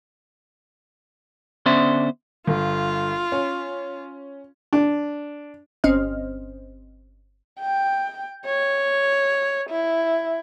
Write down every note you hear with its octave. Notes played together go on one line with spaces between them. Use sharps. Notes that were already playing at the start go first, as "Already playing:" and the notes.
D3 B3 C#4 C5 D5 E5
G1 F4
C#4
D4
G1 C4 C#4 C5 D#5 F6
G5
C#5
E4